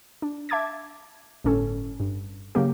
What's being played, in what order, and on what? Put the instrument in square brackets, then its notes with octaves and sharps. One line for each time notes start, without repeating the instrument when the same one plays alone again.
[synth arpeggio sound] D4
E5 A5 D6 G#6 A6
G1 A2 C#4 A4
G2
C#3 F#3 A#3 G4